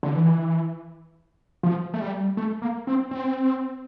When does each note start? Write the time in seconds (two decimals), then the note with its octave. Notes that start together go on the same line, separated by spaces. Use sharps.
0.03 D3
0.15 E3
1.63 F3
1.94 A3
2.01 G3
2.37 A3
2.62 A#3
2.87 C4
3.11 C4